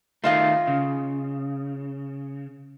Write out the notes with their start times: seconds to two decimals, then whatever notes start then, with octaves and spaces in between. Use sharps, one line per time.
0.24 D#3 A3 F4 D#5 F5
0.68 C#3